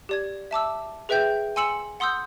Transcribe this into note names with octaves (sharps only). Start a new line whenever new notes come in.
G4 D5 G#6
E5 A5 D6 E6
G#4 B4 E5 G5 G6
G#5 C6 E6 C#7 E7 F#7
F#5 C6 D#6 E6 G6